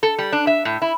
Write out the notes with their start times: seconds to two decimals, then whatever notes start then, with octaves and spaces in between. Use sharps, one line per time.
0.03 A4
0.18 G3
0.32 D4
0.47 E5
0.65 A2
0.82 E4